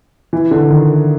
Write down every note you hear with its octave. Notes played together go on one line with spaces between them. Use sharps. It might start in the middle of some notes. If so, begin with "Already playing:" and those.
E3
D3
D#3